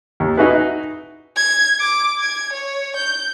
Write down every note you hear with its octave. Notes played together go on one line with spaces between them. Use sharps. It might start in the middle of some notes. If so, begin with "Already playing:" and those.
D#2
D#4 E4 F#4 G#4 B4
G#6
D6
G#6
C#5
G6